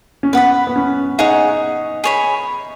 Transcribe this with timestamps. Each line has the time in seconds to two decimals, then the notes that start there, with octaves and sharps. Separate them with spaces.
0.23 C#4
0.33 B3 B4 F#5 B5
0.67 B3
0.76 C#4
1.19 D#4 G#4 C#5 F#5
2.04 G#4 C#5 B5